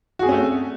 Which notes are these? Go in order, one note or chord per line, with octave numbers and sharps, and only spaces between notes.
A3 C4 C#4 F#4 G#4